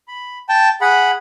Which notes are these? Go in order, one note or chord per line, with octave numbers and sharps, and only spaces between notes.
B5
G5 A5
G#4 F#5 B5